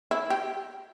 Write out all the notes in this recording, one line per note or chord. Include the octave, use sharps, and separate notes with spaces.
E4
G4